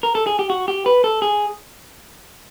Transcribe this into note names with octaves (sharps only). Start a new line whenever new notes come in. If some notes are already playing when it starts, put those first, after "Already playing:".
A#4
A4
G#4
G4
F#4
G4
B4
A4
G#4